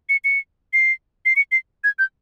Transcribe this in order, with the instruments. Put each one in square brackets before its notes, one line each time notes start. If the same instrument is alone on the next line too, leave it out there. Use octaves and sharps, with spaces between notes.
[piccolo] C#7
C#7
C7
C7
C#7
C7
G#6
G6